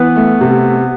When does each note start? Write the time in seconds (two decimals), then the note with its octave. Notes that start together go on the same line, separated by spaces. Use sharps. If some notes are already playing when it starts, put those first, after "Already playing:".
Already playing: E3 B3
0.16 A3
0.41 C3